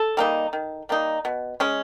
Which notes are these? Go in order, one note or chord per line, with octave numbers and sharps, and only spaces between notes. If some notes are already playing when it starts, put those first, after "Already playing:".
Already playing: A4
G3 A#3 D#4
D#3
G3 A#3 D#4
B2
G#3 C#4